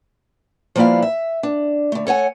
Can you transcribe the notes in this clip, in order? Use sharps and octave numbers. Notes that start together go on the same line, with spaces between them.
F3 G3 A#3 B3 E4 F5
E5
D4
D3 A3
A4 C#5 F#5 G#5